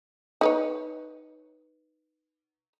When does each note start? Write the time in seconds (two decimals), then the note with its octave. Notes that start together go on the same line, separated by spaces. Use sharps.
0.41 D#4 B4 C#5